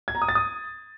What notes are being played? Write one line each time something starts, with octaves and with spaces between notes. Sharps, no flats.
G#6
A#5
D#6
A6
D#6